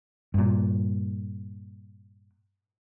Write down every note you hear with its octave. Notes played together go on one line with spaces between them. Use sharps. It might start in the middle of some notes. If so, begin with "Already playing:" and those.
G2 A#2